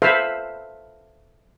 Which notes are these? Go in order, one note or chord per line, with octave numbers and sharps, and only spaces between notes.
A4 B4 C5 E5 F5